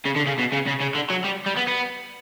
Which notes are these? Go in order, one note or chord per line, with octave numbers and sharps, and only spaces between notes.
C#3
D3
C#3
B2
C#3
C#3
C#3
D3
F#3
G3
G3
B3
B3